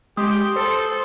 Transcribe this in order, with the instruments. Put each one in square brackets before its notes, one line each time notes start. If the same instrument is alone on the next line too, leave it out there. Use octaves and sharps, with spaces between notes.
[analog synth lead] G#3 [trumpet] G4 [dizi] C6 [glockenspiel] D#6
[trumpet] A4 [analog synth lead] C5